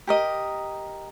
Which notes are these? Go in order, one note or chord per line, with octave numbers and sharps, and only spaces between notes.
G4 A#4 D#5